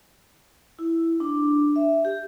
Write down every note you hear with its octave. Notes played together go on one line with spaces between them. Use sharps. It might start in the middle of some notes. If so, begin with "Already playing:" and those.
E4
D4
E5
G4